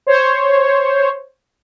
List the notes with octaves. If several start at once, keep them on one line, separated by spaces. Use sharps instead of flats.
C5 C#5